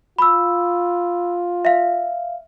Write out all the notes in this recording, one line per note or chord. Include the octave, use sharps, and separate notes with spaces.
F4 B5 E6
E5 F5